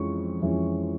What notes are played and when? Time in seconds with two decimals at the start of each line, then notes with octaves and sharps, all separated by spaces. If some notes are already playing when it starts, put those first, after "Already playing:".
Already playing: F2 E3 G#3 C#4 C#6
0.42 F2 E3 G#3 C#4